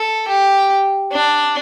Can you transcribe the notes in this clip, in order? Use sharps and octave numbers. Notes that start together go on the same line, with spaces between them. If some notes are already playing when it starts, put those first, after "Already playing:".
Already playing: A4
G4
D4